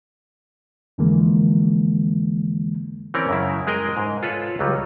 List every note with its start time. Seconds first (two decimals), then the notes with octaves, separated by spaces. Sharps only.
0.98 F2 D3 E3 F3 G#3 A#3
3.14 E3 C4 C#4 A#4 D5
3.29 F#2 C#3 E4
3.67 G#3 G#4 A#4 D#5 G5
3.97 G#2
4.23 F4 A4 B4 C#5
4.59 C#2 F#3 G3